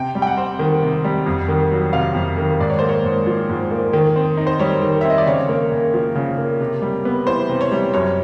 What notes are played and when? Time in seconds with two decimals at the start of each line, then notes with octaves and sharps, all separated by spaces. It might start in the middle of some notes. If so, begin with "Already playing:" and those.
Already playing: C3 G5
0.15 G3
0.22 G5
0.27 F#5
0.37 C4
0.59 D#3
0.83 C3
1.05 G3
1.26 F2
1.48 D#3
1.72 F#3
1.93 C3 F5
2.15 F2
2.38 D#3
2.60 G#2 D5
2.70 C#5
2.79 A#3 C5
2.89 C#5
3.04 G#2
3.27 F3
3.49 G#2
3.71 A#3
3.93 D#3
4.16 C4
4.37 D#4
4.47 C5
4.60 G3 C#5
4.82 D#3
5.01 C4 E5
5.10 D#5
5.18 D5
5.26 C#3 C#5
5.49 A#3
5.72 C#3
5.94 F3
6.15 C#3
6.38 A#3
6.60 C3
6.82 G3
7.05 B3
7.27 E3 C5
7.49 C3
7.61 C#5
7.72 G3
7.94 F#2 C#5